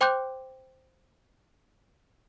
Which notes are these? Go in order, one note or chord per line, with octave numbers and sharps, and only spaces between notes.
C5 G5 C6 D6 F#6 G6